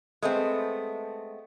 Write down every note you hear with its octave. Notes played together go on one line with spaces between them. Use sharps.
G#3 A3 B3 C4